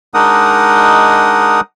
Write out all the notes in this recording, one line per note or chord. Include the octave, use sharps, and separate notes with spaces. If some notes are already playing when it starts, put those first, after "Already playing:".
G#3 D4 D#4 A#4 F#5 D#6